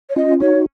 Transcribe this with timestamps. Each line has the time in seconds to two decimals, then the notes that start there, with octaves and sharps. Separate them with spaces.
0.10 C#5
0.16 C#4 F4 D#5
0.40 D#4 F#4 C#5